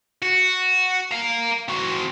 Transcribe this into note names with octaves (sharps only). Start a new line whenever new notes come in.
F#4
F5 A#5
C4 F#4